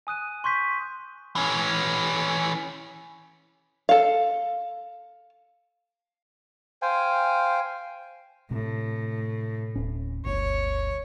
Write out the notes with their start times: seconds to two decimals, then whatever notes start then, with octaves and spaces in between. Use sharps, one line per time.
0.07 G#5 D#6 F#6 D#7
0.44 C6 C#6 G6 B6
1.36 E3 C#4
3.89 A4 F5
6.82 C5 F5 G5 G#5
8.51 A2 C3
9.76 D1 C#4
10.25 G1 D2 C#5